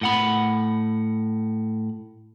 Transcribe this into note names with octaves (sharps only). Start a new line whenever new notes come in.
A2 F#5 B5